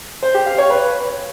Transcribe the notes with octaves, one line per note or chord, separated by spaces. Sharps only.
C5
G4
F5
C#5
B4